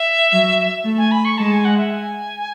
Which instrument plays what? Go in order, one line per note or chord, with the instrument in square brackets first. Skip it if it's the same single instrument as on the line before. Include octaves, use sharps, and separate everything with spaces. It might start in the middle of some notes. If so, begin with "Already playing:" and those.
Already playing: [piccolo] E5
[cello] F#3
A3
[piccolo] G#5
B5
C#6
[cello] G#3 [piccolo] A5
[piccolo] G#5
F#5
E5
G#5